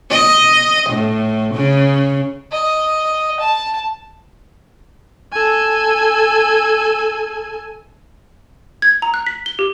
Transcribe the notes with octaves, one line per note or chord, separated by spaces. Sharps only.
D#5
A2
C#3
D#5
A5
A4 G#5
G#6
A#5
F#6
B6
G7
G4